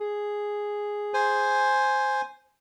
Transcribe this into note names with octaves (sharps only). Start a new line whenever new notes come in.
G#4
C5 G#5